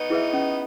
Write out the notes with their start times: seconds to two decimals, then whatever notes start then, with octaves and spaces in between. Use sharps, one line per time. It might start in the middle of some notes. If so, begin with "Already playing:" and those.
Already playing: B3 D#4
0.10 E4 G#4 B4 E5
0.33 C#4